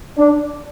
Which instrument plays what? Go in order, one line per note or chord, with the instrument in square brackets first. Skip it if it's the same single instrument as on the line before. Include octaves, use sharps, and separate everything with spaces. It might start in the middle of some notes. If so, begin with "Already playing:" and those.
[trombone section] D4